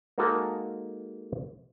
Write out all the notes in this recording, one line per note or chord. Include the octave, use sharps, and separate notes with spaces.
G#3 A#3 D#4 F#4 A4 A#4